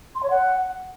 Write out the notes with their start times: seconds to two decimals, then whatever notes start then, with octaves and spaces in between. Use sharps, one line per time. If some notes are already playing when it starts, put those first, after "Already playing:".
0.15 C6
0.22 C#5
0.30 F#5